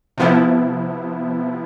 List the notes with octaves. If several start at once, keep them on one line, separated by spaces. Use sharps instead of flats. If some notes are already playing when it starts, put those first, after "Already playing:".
C3 F3 B3 E4